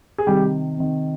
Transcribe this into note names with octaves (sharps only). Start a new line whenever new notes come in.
G#4
C3 D#3 G3 G4
C3 D#3